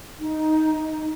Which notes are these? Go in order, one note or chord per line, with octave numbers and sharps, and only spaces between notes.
D#4